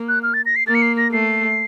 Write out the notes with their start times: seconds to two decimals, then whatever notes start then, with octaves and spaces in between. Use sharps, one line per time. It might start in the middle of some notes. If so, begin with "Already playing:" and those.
Already playing: A#3
0.09 F#6
0.23 F6
0.34 A6
0.46 A#6
0.56 C7
0.67 A#3 A6
0.75 C#7
0.82 C7
0.98 A#6
1.12 A3 C7